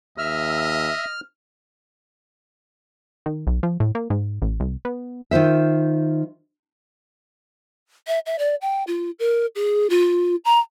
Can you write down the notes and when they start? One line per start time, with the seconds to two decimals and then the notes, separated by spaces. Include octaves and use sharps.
0.18 D#2 D#5 E5 E6 F6
3.26 D#3
3.47 B1
3.63 F3
3.80 A2
3.95 A#3
4.10 G#2
4.42 A1
4.60 C2
4.85 B3
5.31 D#3 F4 C5 E5
8.07 E5
8.26 E5
8.39 D5
8.61 G5
8.87 F4
9.19 A#4
9.55 G#4
9.90 F4
10.45 A#5